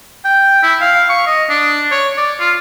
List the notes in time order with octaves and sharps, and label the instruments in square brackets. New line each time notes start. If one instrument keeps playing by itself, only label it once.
[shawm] G5
E4
F5
C#6
D#5
D4
C#5
D5
F4